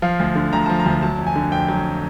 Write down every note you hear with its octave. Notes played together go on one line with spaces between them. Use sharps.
F3 F5
D2
D3
D2 A#5
F3 A5
A#5
D2
F#3 A5
F2
G#5
D3
F2 G5
F#3